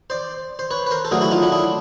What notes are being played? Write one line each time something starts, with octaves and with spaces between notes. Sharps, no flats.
C5 D5
C5
B4 C#5
B4
A#4 C5
A4
D3 F#3 A3 G#4 A#4
E4 F#4
D#4 F4
D4 E4
D4 E4